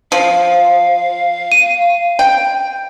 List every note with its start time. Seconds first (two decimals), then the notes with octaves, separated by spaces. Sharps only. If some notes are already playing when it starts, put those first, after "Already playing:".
0.12 F3 F5
1.52 D#7
2.19 G5